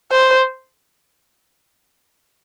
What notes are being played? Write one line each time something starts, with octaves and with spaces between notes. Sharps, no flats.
C5